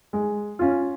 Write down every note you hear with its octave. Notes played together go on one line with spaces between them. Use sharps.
G#3
C#4 F4